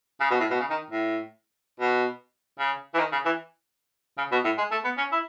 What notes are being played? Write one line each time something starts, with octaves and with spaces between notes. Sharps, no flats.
C#3
B2
A2
B2
C#3
D#3
A2
B2
C#3
E3
D#3
C#3
E3
C#3
B2
A2
G#3
A3
B3
C#4
E4